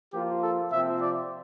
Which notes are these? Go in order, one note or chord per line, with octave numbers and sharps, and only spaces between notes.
F3 A#3 F4 G4
A4
C3 F3 C4 E5
D5